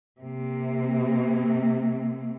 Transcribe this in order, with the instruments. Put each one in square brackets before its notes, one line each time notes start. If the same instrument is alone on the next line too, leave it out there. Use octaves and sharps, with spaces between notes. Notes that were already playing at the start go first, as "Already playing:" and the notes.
[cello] C3 A#3